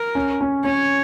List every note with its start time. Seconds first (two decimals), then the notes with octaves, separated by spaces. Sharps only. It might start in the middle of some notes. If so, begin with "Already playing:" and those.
Already playing: A#4
0.15 C#4
0.41 C#4
0.64 C#4 C#5